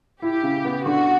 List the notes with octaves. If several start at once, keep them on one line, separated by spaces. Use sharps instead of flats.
E4 G4
C#3
B3
D3 F#4